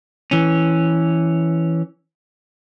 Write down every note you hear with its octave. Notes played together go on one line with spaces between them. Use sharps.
E3 C#4